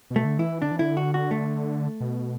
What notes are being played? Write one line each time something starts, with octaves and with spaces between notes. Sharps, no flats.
B2
A3
D3
E3 E4
D3 D4
E3
D3 E4
F#4
F#4
A3
B2